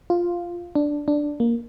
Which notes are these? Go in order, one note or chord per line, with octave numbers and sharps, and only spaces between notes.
F4
D4
D4
A#3